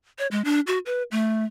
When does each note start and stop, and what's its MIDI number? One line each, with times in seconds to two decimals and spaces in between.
0.19 0.27 73
0.31 0.44 56
0.45 0.60 62
0.67 0.79 66
0.86 1.03 71
1.11 1.45 57